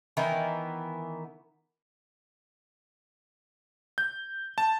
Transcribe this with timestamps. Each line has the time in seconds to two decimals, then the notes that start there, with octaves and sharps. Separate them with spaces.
0.17 D#3 E3 B3 A#4
3.98 G6
4.58 A5